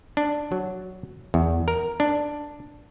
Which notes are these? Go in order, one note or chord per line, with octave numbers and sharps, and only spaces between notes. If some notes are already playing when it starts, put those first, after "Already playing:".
D4
F#3
E2
A#4
D4